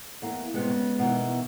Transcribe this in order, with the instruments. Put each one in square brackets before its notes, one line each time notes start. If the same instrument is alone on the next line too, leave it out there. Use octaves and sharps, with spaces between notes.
[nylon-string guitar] E2 A#3
[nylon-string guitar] C3 G3 [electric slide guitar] G#3 B3
[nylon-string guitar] C#3
B2 D#3 E3